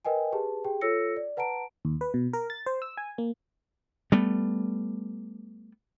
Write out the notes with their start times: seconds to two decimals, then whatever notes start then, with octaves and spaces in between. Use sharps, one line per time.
0.05 A#4 B4 D#5 G5 G#5
0.32 G4 G#4 B4 A5
0.65 G4 G#4 G5
0.81 F4 A4 C#5 E6 A#6 C#7
1.17 D5
1.37 B4 F#5 A5 A#5 D7
1.85 D#2
2.01 B4
2.14 B2
2.33 A#4
2.50 A6
2.66 C5
2.82 E6
2.97 G#5
3.18 A#3
4.12 G3 A3 B3